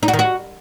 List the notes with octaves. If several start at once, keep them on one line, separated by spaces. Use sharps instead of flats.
D#4
F#4
D#3
F#4